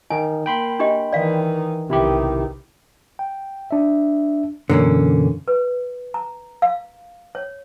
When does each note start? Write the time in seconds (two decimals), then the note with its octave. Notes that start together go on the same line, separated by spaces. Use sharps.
0.10 D#3 D#4 G#5
0.46 A#3 G5 B5 C6
0.79 D4 G4 D#5
1.13 D#3 E3 D5 F5
1.90 B1 C3 D#3 E4 G4
3.19 G5
3.71 D4 E5
4.70 F#2 B2 D3 E3 A#3 C#4
5.48 B4
6.14 A#5
6.62 F5
7.35 C#5